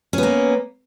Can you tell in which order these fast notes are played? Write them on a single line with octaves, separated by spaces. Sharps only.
C#4 B3 A#3